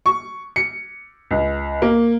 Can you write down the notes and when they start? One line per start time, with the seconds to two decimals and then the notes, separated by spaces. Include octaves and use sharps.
0.06 C#6
0.56 C#7
1.31 C#2
1.82 A#3